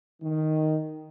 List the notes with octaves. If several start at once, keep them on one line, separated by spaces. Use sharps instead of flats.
D#3